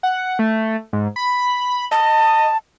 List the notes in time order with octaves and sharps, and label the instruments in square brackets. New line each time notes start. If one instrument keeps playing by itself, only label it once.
[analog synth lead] F#5
A3
G#2
B5
[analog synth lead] D#5 [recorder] A5